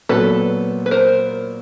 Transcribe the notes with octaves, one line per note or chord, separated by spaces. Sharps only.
A#2 F#3 B3 A4 B4
B4
A#4 C5